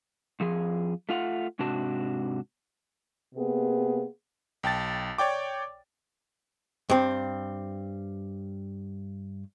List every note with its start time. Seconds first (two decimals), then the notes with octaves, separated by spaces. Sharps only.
0.40 F2 F3 G#4
1.09 A3 F4 F5 F#5
1.59 G#2 C3 D4 F#4 A5
3.35 C3 A#3 B3 G#4
4.63 B1 G5 A5 A6
5.18 C#5 D5 G5 D6
6.90 G2 C4